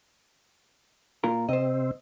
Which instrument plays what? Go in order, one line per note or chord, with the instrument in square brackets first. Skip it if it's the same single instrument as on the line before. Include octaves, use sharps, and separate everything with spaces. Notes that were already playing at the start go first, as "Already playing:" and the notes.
[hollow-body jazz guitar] A#2 F4 A#4
[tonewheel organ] C3 C4 [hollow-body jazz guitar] C5 D#5